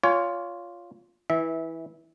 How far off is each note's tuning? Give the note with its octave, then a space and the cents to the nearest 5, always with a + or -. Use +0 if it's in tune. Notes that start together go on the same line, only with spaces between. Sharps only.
F4 +0 C#5 +25 G#5 -15
E3 -15 E5 -25